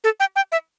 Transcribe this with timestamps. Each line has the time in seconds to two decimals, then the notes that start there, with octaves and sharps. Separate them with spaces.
0.04 A4
0.20 G5
0.36 G5
0.52 E5